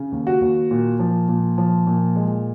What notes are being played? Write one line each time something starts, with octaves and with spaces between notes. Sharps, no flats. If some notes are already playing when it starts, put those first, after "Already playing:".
Already playing: C#3
D#2
F#4
D#2
A#2
F3
A#2
F3
A#2
G#3